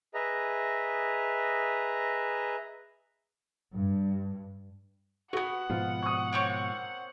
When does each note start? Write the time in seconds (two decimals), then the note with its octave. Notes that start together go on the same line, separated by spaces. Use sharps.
0.14 G#4 B4 D#5 E5 A#5
3.74 G2
5.33 A3 B3 F#4 F#5
5.70 G#2 B2 F3 F4
6.03 C#6 D#6
6.33 A#3 C4 C#5